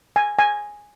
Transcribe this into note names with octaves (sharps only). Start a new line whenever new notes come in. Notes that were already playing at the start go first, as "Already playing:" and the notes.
G#5
G#5